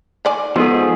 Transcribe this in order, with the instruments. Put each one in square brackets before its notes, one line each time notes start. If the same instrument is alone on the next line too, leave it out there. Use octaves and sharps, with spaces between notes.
[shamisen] D#3 D5 G#5
[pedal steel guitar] F3 G#4 [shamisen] G#3 [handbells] B3 D#4 A4